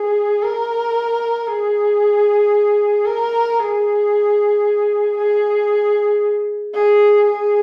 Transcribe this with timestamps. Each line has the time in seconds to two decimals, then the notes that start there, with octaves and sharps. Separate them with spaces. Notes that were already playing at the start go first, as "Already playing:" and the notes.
Already playing: G#4
0.42 A#4
1.48 G#4
3.05 A#4
3.59 G#4
5.17 G#4
6.74 G#4
7.27 G#4